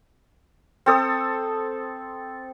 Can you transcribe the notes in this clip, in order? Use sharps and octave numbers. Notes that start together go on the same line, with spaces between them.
C4 A4 D#6